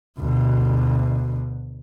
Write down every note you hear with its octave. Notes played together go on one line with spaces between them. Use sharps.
D2 B2